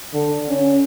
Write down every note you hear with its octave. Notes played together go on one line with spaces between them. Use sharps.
D3
C#4